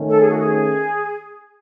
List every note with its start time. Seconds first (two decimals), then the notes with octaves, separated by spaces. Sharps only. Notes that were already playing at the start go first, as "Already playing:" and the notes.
Already playing: D#3 A3 C#4
0.09 A4
0.20 G#4
0.30 F#4
0.39 G#4